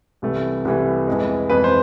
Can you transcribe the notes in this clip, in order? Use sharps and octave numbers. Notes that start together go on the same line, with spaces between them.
C2 C3 E3 A3
C2 C3 E3 A3
F2 E3 G#3
F2 E3 G#3 B4
C5